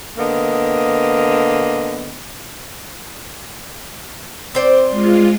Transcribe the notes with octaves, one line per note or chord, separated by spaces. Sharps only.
D3 A#3 B3 D#5
C4 C5 D5
G#3 F4